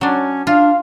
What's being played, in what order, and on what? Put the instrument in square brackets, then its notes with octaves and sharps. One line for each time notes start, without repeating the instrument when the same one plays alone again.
[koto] F#3 D4 [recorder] C#4
[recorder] D4 [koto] F4 [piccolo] F5